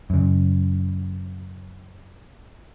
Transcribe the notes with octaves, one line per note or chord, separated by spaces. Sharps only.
F#2 C#3